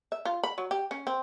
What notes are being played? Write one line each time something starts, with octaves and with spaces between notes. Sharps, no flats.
E5
F4
B5
F#3
G4
C#4
C4